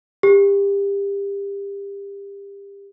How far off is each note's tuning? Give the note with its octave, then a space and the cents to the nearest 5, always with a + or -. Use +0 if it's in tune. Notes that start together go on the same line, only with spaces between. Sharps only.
G4 +30